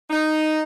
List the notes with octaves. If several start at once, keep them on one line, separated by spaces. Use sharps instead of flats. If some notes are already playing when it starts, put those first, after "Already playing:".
D#4